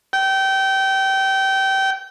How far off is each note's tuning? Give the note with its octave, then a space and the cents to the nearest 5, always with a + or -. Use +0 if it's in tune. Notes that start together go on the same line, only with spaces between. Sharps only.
G5 -25